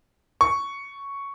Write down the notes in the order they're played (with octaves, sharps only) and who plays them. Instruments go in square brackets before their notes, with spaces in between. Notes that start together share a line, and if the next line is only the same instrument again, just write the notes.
[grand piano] C#6